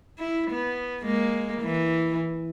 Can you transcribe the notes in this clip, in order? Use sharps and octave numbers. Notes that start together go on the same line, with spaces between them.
E4
B3
G#3 A#3
E3